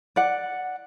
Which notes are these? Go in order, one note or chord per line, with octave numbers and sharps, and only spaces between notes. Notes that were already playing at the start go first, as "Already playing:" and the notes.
D5 F#5